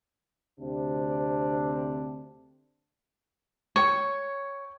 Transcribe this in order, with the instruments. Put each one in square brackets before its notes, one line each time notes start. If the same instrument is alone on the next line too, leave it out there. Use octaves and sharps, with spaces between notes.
[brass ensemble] D2 C3 C4 D4
[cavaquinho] C#5 [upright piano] G5 C#6